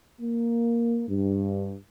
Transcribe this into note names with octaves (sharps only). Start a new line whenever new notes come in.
A#3
G2